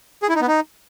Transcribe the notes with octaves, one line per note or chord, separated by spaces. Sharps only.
G#4
E4
D#4
B3
D#4